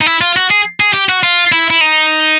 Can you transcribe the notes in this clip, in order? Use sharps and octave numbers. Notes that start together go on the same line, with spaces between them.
D#4
E4
F4
F#4
G#4
G#4
G4
F#4
F4
E4
E4
D#4